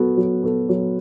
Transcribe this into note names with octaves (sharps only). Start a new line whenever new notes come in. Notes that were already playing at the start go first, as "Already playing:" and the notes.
Already playing: F#3 B3 F#4 A4
F#3
B3 F#4 A4
F#3